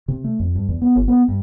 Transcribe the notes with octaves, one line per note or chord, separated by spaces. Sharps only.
C3
A3
F2
G2
E2
B3
G1
B3
G2